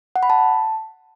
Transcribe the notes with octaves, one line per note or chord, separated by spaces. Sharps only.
F#5
B5
A5